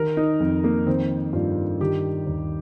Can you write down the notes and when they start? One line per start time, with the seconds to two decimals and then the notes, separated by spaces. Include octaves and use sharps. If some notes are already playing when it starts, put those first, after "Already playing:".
Already playing: D#3 A#4
0.17 D#4
0.40 F2
0.64 A#3
0.86 D#3 C4
1.33 G2 F4
1.80 D#3 G4
2.26 D#2